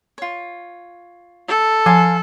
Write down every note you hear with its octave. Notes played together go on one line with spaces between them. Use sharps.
F4 C#5
A4
F3 C5 F5 G#5